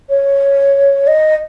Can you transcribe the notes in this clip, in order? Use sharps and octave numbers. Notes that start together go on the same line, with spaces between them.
C#5
D#5